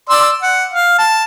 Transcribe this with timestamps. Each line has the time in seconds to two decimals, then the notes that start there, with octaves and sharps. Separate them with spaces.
0.10 D5 C6 E6
0.42 F#5
0.73 F5
0.98 A5